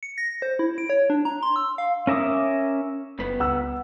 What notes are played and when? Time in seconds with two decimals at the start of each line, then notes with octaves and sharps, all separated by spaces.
0.03 C#7
0.18 A#6
0.42 C5
0.59 E4
0.78 D7
0.90 C#5
1.10 D4
1.25 A#5
1.43 C6
1.56 E6
1.78 F5
2.07 C#4 A#4 E5 D6 D#6
3.19 F#1 G2 B3 B4
3.40 C#2 F#5 E6